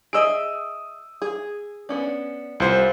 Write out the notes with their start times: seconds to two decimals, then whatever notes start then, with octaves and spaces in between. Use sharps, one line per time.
0.13 G#4 D#5 E5 D#6 E6 D7
1.22 G#4
1.89 B3 C#4 D4
2.60 C2 F4 C5